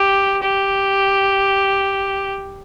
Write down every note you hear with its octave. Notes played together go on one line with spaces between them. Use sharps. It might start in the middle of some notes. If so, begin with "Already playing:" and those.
Already playing: G4
G4